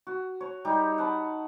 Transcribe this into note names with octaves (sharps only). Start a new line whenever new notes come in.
F#4
C#5
G3 D#4 G4
F#5 A5 B5